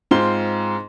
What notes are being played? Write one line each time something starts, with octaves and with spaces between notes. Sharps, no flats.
G#2 C4 F4 C5 C6 G7